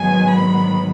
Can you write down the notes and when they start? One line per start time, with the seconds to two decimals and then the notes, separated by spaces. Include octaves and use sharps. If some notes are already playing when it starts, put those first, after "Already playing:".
Already playing: G#2 D#3 F#3 B3 G#5
0.28 B5